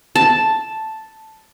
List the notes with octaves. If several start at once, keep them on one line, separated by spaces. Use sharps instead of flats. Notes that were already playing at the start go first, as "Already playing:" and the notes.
A5